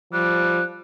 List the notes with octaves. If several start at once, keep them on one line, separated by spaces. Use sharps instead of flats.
F3 G3 F#6